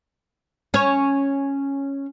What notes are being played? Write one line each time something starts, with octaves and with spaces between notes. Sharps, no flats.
C#4 C#5